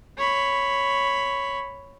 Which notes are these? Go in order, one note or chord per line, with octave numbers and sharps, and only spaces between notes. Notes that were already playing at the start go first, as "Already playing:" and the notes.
C#5 B5